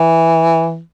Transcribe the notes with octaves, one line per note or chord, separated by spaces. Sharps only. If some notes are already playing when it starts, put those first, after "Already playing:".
Already playing: E3